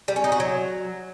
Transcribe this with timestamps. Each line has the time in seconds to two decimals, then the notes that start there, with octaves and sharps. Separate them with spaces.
0.08 G3
0.16 C#4
0.24 D#4
0.32 F#4
0.40 F#3